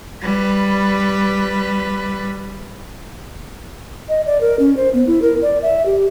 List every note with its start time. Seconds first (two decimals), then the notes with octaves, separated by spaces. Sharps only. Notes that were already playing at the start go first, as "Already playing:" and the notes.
0.22 G3 B4
4.09 D#5
4.26 D5
4.41 A#4
4.59 C#4
4.77 C5
4.94 B3
5.07 E4
5.22 A#4
5.42 D5
5.62 E5
5.86 G4